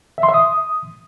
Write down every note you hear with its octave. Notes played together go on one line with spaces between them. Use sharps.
E5
C6
E5
D#6